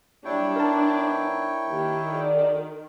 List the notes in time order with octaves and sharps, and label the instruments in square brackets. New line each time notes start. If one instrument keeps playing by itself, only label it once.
[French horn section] A#2 F#3 G3 [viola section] D4 [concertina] E4 C#5 G5
[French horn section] E3 B3 D#4 [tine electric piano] A#4 A5
[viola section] D#3 [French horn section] A#3 G4
[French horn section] F#4 G#4 D5